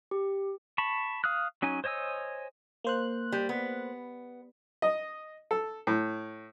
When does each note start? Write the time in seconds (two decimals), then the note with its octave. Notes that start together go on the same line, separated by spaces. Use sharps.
0.11 G4
0.78 A5 B5 C#6
1.24 F5 D#6 F6 F#6
1.62 F#3 C#4 D#4 G#5
1.84 C5 C#5 D#5 G#5 E6
2.84 A#3 C5 F#6
3.32 G3
3.49 B3
4.82 D#5
5.51 A4
5.87 A2